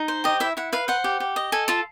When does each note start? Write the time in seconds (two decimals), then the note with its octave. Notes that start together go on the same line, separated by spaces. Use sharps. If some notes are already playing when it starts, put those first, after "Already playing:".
Already playing: D#4
0.08 C5
0.24 G4 D#5
0.40 E4 E5
0.57 E4 F#5
0.73 B4 F5
0.88 C5 F#5
1.04 G4
1.20 G4
1.36 D#5
1.52 A4 G#5
1.68 F4 A5